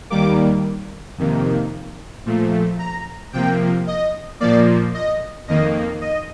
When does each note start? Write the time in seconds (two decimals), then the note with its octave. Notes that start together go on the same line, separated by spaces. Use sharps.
0.10 D#2 D#3 G3 A#3 D6
1.18 F2 C3 D#3 A#3
2.25 A#2 F3 A3
2.79 A#5
3.33 C3 F3 A#3 G5
3.87 D#5
4.40 A#2 F3 A#3 D5
4.94 D#5
5.48 F2 D#3 A#3 D#5
6.01 D#5